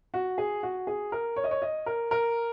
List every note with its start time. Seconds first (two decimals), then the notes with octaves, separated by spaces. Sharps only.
0.14 F#4
0.38 G#4
0.63 F#4
0.87 G#4
1.12 A#4
1.36 C#5
1.44 D#5
1.51 C#5
1.62 D#5
1.86 A#4
2.11 A#4